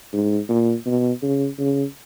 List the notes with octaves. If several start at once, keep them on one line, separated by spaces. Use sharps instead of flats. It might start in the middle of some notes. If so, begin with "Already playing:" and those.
G#2
A#2
B2
C#3
C#3